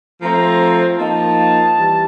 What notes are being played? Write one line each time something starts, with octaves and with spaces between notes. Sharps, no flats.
F3 A3 C4 A#5
F3 A#3 D#4 A5
E3 G3